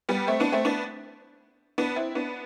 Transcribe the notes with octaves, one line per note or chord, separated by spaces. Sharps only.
G3 B3
A3 C4
B3 D4
A3 C4
B3 D4
B3 D4
C4 E4
B3 D4